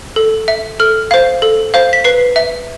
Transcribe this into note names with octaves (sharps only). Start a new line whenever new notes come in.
A4
E5
A4 F6
C5 F5
A4
C5 F5
B6
B4 C7
E5